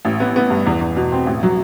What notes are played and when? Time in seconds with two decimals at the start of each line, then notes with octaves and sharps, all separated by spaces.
0.05 A1
0.20 B3
0.36 B3
0.50 G2
0.66 E2
0.81 E2
0.96 B2
1.12 C4
1.26 A1
1.43 F#3